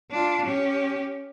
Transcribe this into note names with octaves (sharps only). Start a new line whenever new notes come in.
D4 F4
C#4 G4